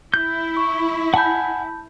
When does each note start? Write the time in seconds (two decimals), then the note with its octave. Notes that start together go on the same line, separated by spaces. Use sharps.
0.14 E4 G6
0.57 C#6
1.14 F#5 G#5 A5 B5 G6